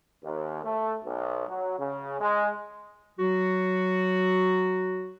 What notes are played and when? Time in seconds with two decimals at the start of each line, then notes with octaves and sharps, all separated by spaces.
0.23 D#2
0.63 A3
1.03 B1
1.48 F#3
1.79 C#3
2.20 G#3
3.18 F#3 F#4